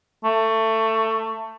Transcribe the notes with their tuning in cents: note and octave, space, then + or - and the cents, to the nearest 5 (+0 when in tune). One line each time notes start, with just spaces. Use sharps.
A3 +20